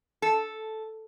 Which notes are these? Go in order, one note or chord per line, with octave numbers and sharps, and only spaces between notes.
A4